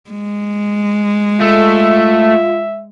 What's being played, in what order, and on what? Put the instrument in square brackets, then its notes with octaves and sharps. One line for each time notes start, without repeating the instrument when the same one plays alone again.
[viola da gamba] G#3
[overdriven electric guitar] A3 [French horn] F4 [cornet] E5